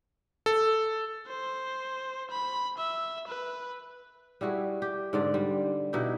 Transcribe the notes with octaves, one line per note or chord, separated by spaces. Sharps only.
A4
C5
B5
E5
B4
G3 E4 F#4 G#4
G4
G#2 D3 D5
G3
B2 D#4 E4 G4